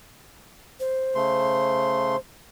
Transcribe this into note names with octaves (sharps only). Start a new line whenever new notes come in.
C5
C#3 A3 C6